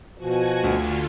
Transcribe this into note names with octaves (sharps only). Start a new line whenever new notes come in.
B2 F3 F#4 G#5
D2 D3 F4